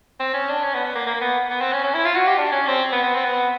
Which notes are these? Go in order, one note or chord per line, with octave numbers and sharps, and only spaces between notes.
C4
C#4
D4
C#4
B3
B3
A#3
A#3
B3
B3
C4
C#4
C#4
E4
F4
F#4
G4
D4
C#4
C4
B3
B3
C4
B3